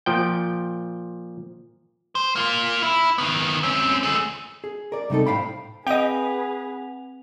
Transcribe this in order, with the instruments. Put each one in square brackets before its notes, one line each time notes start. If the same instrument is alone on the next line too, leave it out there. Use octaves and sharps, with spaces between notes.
[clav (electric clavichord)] A#2 F3 G5
[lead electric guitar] C5
A#3 F4
E4
D#3 B3
C4 C#4
A3 G#4
[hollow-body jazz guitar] G#4
A#4 D5
C3 G3 D#4 A4
A2 C5 F5 G5 B5
[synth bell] C4 F#5 F7 [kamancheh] G#4 B4 [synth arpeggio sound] D#5 G5